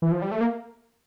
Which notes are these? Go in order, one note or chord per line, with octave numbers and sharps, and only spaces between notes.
E3
F3
G3
A3
A#3